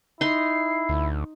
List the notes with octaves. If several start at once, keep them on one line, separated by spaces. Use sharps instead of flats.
D#4 E4 C6 C7
D2